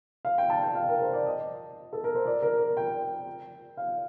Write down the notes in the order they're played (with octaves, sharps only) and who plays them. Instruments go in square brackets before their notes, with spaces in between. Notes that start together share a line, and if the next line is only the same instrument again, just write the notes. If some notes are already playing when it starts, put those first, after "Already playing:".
[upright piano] F5
G5
A5
G5
F5
A#4
C5
D5
D#5
A4
A#4
C5
D5
A#4
A#4
G5
F5